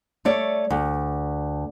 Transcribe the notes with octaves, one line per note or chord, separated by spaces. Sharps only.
A3 C#5 D5
D2